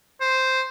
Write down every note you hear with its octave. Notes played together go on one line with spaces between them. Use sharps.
C5